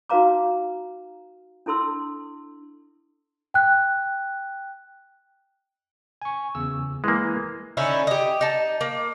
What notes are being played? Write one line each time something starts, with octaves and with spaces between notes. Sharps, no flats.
D#4 F#4 B4 F5 A#5 D6
D4 E4 A4 C6 E6
G5 F#6
G#5 C#6
E2 C#3 E6
E3 G#3 A#3
D3 C#4 D#4 E4
G4 D#5
D#4 A5
A#3